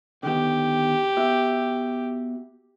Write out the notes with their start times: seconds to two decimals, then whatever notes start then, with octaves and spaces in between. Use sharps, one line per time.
0.23 D3 D#3 B3 G4
1.17 B3 F#4 E5